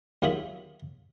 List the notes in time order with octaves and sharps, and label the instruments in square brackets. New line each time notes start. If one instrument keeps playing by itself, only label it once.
[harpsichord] D#2 F#3 F4 G#4 E5 B5